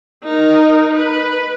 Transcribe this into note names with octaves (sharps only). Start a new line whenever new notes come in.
D#4 A#4
B4